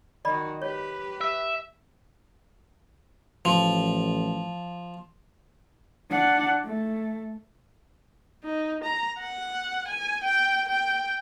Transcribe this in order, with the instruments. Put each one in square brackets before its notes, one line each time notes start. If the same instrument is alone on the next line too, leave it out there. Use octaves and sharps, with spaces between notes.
[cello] D#3 F#4 [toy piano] D5 D#5 B5
[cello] G4 B4 [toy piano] C#5
[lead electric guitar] E5
[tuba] A1 [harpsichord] F3
[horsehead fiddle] D4 F#5
A3
[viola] D#4
A#5
F#5
G#5
G5
G5